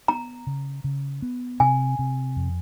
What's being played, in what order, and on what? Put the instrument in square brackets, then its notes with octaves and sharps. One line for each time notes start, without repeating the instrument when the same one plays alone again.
[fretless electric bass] B3 [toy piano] A#5
[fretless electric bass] C#3
C#3
B3
[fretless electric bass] C3 [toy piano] G#5
[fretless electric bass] C3
F2